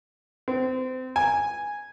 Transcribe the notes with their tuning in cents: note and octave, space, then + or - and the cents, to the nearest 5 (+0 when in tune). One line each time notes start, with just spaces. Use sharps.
C4 -30
G#5 -5